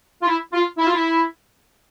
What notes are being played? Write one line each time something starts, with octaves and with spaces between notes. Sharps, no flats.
F4
E4
F4
E4
F4
E4